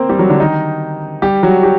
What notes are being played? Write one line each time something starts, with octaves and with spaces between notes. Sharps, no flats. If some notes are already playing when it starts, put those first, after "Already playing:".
Already playing: A#3 C4 A#4 C5
G3 G4
F#3 F#4
D3 D4
D#3 D#4
G3 G4
F#3 F#4
G4